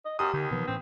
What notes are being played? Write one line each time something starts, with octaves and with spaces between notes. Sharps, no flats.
D#5
F#2 G4 D#6
D#2 D3
B2 E3 F3 B3
A2 E3 C4 C#4